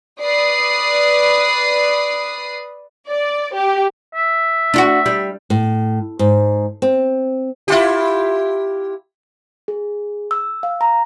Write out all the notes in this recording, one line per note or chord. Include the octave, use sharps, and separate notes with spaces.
B4 D5 D#6 C7
D5
G4
E5
D4 F4 F#4
G3
A2
G#2
C4
E4 F4 G4
G#4
E6
F5
A#5